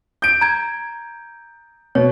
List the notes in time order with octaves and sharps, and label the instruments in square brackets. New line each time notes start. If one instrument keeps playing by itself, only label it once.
[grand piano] G6 D7
[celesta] A#5 G#6
[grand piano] B2 [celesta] C#5